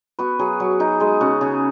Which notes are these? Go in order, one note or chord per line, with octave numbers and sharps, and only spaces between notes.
B3 F#4 B4
F#3 G#4
F#3 F#4
D#4 G#4
G#3 G#4
C#3 F#4
C#3 G#4